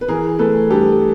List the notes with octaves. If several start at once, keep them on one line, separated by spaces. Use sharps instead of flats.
B4
E3 G#4 A#4
A3 A4 B4
G2 G4 A4